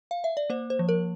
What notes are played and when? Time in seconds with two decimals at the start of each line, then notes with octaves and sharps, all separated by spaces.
0.11 F5
0.24 E5
0.37 D5
0.50 A#3 C5
0.70 C5
0.79 F3
0.89 A#4